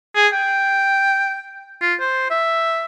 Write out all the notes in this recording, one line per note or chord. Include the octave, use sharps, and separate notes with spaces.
G#4
G5
F4
C5
E5